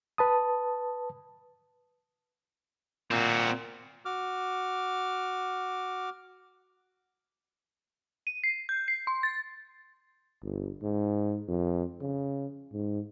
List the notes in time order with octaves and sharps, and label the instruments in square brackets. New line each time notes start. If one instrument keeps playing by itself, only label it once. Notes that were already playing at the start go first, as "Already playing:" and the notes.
[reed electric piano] B4 A5 D#6
[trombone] A#2 [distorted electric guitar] C4 F#4
[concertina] F#4 D6 F6
[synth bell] D#7
C7
G6
C7
C6
A6
[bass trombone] G1
G#2
F2
C#3
G#2